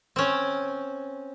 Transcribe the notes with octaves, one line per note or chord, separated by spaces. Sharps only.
C4 C#4